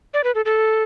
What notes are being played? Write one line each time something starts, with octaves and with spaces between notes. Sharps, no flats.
D5
B4
A4
A4